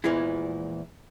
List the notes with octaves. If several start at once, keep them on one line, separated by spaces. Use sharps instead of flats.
E2 A#2 E3 F3 G#3 E4